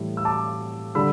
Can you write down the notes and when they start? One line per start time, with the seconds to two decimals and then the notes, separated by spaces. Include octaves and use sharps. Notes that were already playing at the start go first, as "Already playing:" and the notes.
Already playing: A2 E3 G3
0.17 E6
0.25 A5 D6
0.95 D3 G3 B5 E6